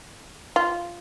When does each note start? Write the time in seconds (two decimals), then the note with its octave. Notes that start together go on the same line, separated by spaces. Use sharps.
0.56 F4